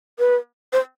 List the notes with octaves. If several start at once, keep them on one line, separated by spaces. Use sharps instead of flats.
B4
C5